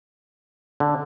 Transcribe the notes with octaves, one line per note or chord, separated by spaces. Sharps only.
D3